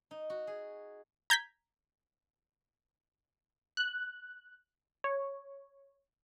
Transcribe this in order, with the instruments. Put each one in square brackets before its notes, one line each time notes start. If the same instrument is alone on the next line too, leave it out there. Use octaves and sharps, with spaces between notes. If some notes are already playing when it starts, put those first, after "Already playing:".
[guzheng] D#4
F#4
G#4
[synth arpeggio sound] A#5 G6 G#6 B6
[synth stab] F#6
C#5